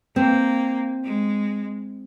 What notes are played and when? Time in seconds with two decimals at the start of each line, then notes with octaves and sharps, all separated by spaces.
0.16 A#3 C4
1.03 G#3